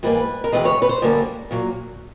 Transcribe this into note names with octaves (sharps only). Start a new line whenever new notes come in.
G#2 E3 G3 A#3 B4
A#4
D2 C3 E3 G#3 B4
C#5
B4
C5
F#2 D3 G3 A#3
A#2 F#3 A#3